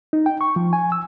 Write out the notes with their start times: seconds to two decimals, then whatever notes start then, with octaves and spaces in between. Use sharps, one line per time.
0.13 D#4
0.26 G5
0.41 C#6
0.56 F3
0.73 G#5
0.92 E6